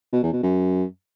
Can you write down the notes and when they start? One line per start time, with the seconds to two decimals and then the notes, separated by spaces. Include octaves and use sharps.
0.13 B2
0.23 E2
0.33 B2
0.43 F#2